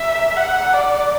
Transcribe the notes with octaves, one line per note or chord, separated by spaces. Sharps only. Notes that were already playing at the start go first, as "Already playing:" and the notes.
Already playing: E5
F#5
D5